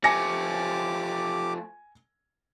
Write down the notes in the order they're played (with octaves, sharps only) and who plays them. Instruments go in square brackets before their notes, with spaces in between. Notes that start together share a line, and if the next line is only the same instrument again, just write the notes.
[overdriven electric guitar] F3 A3 [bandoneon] G4 D6 [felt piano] G#5 A#6 C#7